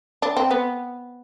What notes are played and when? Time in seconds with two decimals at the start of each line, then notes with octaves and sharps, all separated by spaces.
0.22 D4
0.37 C4
0.50 B3